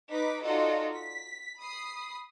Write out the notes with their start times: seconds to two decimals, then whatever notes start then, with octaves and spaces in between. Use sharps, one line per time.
0.11 D#4 B4 D6 B6
0.41 D#4 F4 F#4 A4 D5 D#5
0.95 B6
1.59 B5 D#6 C7